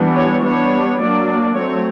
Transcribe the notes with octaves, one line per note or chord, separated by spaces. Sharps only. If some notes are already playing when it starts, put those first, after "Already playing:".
Already playing: E3 G3 B3 D4
C#5
G3 B3 D4 C#5
F#3 A#3 D4 D5
F#3 A3 C4 C#5